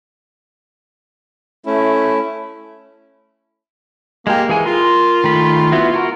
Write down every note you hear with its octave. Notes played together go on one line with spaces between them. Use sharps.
A3 C#4 E4
G#3 A#3 G4
E3 G#3 G#4 G#5
F4 A#4 C6
D#3 A3 B5
B3 E4 F#4
F#4 A#4